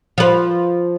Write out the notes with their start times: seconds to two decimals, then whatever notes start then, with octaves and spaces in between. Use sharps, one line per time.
0.18 F3 B4